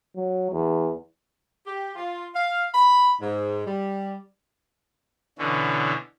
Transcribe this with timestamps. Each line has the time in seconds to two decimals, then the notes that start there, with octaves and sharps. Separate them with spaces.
0.16 F#3
0.51 E2
1.66 G4
1.96 F4
2.35 F5
2.74 B5
3.20 G#2
3.66 G3
5.38 B2 D3 E3 C#4